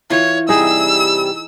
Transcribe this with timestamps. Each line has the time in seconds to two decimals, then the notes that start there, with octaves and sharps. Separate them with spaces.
0.10 E3 F4 C#5
0.49 C3 G3 D#4 G#4 E6